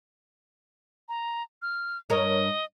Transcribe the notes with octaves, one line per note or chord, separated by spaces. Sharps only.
A#5
F6
G2 A#4 C#5 D#5